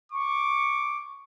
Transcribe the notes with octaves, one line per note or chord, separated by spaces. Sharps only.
C#6 D6